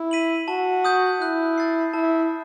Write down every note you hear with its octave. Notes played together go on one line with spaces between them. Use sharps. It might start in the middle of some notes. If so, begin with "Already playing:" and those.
Already playing: E4
B6 D#7 F#7
F#4 A5
D#6 G6
E4 F#6
A6 C7
E4 A5